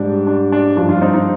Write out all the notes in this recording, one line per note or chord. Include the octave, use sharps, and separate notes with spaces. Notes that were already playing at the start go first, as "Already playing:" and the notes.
Already playing: G#2 G3 D4
D4
D4
G2 F3 D4
D4 F4
C4 D#4
C4 D#4